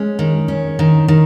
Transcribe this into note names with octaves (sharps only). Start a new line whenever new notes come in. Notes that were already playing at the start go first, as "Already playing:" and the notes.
Already playing: G#3 C#4
D#3
C#4
D#3
D#3